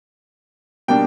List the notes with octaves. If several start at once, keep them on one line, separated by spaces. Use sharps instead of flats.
B2 G3 A#3 D4 G5